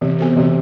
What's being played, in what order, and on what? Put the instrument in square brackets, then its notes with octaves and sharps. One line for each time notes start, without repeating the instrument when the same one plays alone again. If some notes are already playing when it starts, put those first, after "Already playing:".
[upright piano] C3 [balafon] E3
[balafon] B3 F#4 A4 C5
[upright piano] C3 [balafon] E3